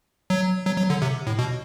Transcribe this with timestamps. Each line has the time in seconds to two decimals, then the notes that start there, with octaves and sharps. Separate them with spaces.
0.30 F#3
0.66 F#3
0.78 F#3
0.90 D3
1.02 C3
1.27 A2
1.39 B2